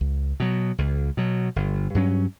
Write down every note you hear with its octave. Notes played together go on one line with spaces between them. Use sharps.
C#2
B2 F#3
C#2
B2 F#3
G1
G2 F#3 C#4